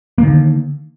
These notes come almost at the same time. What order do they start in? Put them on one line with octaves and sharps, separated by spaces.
A#3 D#3 D3